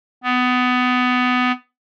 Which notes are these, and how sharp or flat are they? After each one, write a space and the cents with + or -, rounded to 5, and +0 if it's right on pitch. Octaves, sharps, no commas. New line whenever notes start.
B3 +20